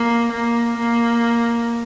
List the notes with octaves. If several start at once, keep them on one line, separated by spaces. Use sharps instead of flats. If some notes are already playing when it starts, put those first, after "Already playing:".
Already playing: A#3
A#3
A#3